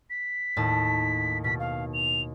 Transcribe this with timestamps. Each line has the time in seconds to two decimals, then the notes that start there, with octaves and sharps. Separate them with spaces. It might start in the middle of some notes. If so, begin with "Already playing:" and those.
0.10 B6
0.56 D#2 A2 A5
1.44 B2 B6
1.60 F5
1.94 F7